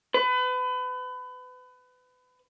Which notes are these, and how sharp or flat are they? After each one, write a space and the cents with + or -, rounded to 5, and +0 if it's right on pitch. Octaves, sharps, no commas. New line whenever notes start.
B4 +30